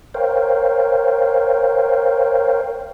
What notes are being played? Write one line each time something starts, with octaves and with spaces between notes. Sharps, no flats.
A#4 C5 C#5 F5 G5